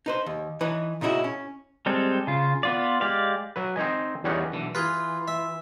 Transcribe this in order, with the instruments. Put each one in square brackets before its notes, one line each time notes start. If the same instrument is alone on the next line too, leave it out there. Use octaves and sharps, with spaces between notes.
[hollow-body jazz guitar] D#4 B4 C5
D#2
E3 D#4 B4 C#5
A#2 C#3 D#4 E4 F#4
C#4
[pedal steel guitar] G3 G#3 C4 A4
C#3 F4
B3 F4 D5
G#3 G4 D5 F5
[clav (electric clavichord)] F#3 B4
C4 D#4 D#5 G#5
E2 G3 C#4 D#4 F#5
[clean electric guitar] B1 D3 E3
[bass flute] E3 [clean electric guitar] F4 [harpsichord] G#4 B4
[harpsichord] E5